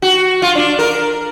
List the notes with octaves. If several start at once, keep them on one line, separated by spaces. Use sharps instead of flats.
F#4
F4
D4
A#4